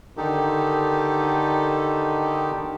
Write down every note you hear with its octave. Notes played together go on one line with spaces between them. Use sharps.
D3 D#3 D#4 G4 A4